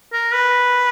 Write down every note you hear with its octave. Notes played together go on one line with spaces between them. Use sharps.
A#4
B4